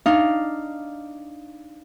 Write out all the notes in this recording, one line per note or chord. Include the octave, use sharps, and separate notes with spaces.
D4 D#4 F5